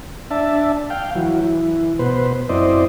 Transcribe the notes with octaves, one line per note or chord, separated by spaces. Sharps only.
D4 E5 A5
F5 G5
E3 F#3
E3
B2 B4 C5
F#2 C4 E4 C5 D5 D#5